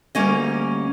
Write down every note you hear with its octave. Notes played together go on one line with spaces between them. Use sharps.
D2 G3 A#3 C#4 D#5